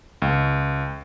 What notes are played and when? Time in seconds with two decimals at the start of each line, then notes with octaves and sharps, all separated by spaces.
0.22 C#2